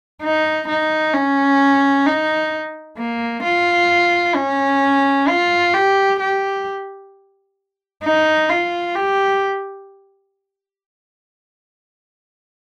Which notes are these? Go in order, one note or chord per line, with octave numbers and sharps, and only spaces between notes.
D#4
D#4
C#4
D#4
A#3
F4
C#4
F4
G4
G4
D#4
F4
G4